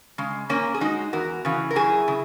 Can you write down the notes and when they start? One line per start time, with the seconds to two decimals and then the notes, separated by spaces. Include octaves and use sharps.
0.18 C#3 G#3
0.49 A#2 A#3 C#4
0.74 G#4
0.81 G#3 D#4 F#4
1.13 E2 F#4 A#4
1.45 C#3 E3
1.71 A#4
1.76 F#2 E4 G#4
2.08 C#3